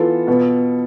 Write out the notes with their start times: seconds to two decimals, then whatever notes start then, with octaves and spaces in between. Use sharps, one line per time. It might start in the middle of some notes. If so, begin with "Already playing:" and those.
Already playing: E3 B3 F4 A4
0.27 B2 B3